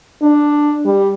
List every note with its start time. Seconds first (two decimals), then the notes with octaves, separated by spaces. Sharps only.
0.22 D4
0.85 G3